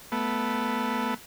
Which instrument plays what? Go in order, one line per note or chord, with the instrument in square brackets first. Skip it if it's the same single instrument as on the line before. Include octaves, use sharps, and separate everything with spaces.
[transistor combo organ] A3 B3